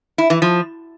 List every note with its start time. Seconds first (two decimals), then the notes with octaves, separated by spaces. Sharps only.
0.18 E4
0.30 E3
0.42 F3